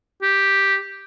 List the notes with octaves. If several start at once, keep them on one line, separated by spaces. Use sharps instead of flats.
G4